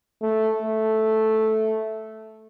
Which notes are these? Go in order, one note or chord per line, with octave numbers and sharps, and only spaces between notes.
A3
A3